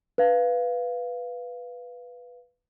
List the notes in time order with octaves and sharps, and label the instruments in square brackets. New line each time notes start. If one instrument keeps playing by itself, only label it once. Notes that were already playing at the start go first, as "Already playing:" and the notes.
[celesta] B4 F5